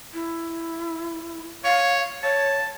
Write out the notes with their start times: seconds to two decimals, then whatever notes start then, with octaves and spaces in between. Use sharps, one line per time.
0.13 E4
1.64 C#5 F5
2.23 C#5 A5